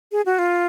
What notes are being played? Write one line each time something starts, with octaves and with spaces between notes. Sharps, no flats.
G#4
F#4
F4